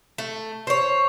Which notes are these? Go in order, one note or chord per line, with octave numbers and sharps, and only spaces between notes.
A3
C5 C#5